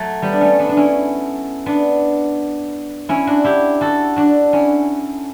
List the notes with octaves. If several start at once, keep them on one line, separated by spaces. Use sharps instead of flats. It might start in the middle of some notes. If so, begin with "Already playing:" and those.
Already playing: F#3 A3
G3 B3
D4
A3 C#4
B3 D4
D4
C#4 E4
B3 D4
C#4 E4
D4 F#4
E4 G4
F#4 A4
D4 F#4
C#4 E4